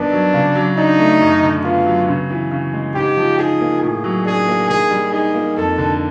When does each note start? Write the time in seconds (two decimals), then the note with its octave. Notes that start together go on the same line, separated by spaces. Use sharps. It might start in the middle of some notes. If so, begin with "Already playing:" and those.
Already playing: G2 D#3 B3 D4
0.12 F#3
0.34 C#3
0.55 F#3
0.77 D4 D#4
0.99 A3
1.21 F#2
1.43 D3
1.64 B3 F4
1.86 F#3
2.08 C#3
2.29 E3
2.51 C#3
2.73 G#3
2.95 G#2 G4
3.17 F3
3.39 D#4 G#4
3.60 A#3
3.82 A2 G#4
4.04 F#3
4.25 D4 G#4
4.48 A#3
4.69 D#3 G#4
4.91 G3
5.12 D#4 G#4
5.34 A#3
5.56 F2 A4
5.78 D3